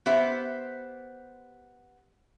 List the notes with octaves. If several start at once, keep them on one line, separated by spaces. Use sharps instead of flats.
B3 G4 C5 E5